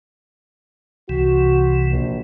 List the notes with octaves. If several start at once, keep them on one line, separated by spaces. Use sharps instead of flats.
C2 C3 E3 F#4
A#1